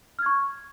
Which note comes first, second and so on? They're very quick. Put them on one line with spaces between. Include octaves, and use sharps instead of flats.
F6 G#6 C#6